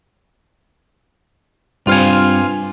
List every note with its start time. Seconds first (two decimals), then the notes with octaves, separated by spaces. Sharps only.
1.87 G2 C4 F4 F5 G#5